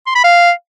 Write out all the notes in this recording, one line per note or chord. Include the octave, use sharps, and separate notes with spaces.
C6
B5
F5